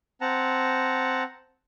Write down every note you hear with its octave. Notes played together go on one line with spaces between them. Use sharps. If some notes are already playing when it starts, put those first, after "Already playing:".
C4 F#5 A5 A#5